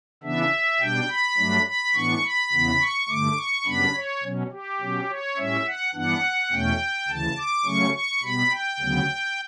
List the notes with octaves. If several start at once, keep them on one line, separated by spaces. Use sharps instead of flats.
C#3 E3 B3 D4 E5
B2 G3 D4 G5
B5
G2 F#3 A3 D4
B5
A2 E3 B3 D4 C#6
B5
E2 C#3 E3 B3
C#6
G2 D3 A3 D6
C#6
F#2 C#3 G3 B3 D4 B5
C#5
B2 F#3 C#4
G4
B2 F#3 C#4
C#5
A2 G3 C#4 E5
F#5
G2 E3 B3 D4 F#5
E2 B2 A3 C#4 G5
D2 C#3 E3 A5
D6
C#3 F#3 A3 C#4 C#6
C#6
B2 G3 B3 B5
G5
D2 C#3 F#3 B3